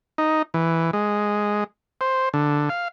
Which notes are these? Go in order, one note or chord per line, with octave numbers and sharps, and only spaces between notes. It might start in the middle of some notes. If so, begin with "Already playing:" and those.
D#4
E3
G#3
C5
D3
F5